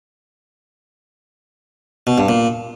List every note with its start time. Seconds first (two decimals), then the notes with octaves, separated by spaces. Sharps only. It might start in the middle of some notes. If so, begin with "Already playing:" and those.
2.07 B2
2.18 G2
2.29 A#2